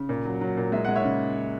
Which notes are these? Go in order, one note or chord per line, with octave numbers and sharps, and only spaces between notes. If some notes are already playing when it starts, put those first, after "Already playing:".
Already playing: C#3
A#2
F#3
F#3
A#2
G#3 E5
G#3 F#5
C#5 E5
C#3